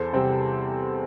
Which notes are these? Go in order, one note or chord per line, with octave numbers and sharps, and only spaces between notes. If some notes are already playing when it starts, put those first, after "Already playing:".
Already playing: E2 A4 C5
C3 G3 C4